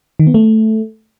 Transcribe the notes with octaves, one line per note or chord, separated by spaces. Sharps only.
D#3
B3
A3